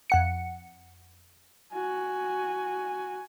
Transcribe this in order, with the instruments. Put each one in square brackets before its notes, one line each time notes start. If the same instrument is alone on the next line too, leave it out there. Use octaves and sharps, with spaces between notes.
[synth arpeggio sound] F2 F#5 C#7
[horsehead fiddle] F#4 G#5